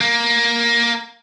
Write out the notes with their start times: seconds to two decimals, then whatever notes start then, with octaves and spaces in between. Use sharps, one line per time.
0.01 A#3